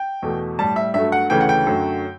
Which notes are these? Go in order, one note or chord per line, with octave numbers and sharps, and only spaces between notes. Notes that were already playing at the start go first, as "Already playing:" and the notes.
Already playing: G5
E2 B2 A3
A2 G3 A5
E5
G2 F#3 A3 E5
F#5
D2 C#3 E3 A3 G5
F#5
G5
F#2 D3 F#3 A3